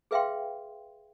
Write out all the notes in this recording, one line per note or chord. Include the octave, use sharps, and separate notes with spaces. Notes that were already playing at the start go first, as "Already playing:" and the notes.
G#4 B4 E5 F5 G5 C6